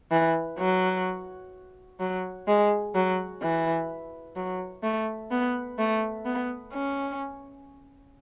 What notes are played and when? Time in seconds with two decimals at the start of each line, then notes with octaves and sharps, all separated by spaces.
0.11 E3
0.58 F#3
2.00 F#3
2.48 G#3
2.94 F#3
3.42 E3
4.36 F#3
4.83 A3
5.31 B3
5.78 A3
6.25 B3
6.73 C#4